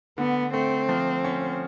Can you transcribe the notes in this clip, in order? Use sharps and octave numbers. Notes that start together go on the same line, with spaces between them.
D3 B3
A3 C4
F3
C#4